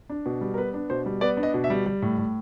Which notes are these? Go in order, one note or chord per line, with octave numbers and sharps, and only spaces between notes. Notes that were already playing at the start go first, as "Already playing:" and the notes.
D4
B2
G3
A#4
B3 B4
D4
B2 C5
G3
B3 D5
D4
D#5
B2
E5
G3
G3
A2
A2